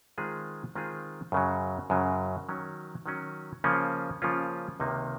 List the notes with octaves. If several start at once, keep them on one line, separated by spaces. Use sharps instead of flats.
D#3 G#3 C4 F4 G#4
D#3 G#3 C4 F4 G#4
F#2 C#3 F#3
F#2 C#3 F#3
D#3 F#3 C#4
D#3 F#3 C#4
C#3 F3 A#3 C#4 F4
C#3 F3 A#3 C#4 F4
C#2 C3 D#3 A#3 D#4